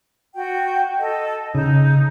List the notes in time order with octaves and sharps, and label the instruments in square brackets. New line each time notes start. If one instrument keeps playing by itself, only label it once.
[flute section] F#4 G5
A4 D#5
[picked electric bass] C#3 [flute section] D#4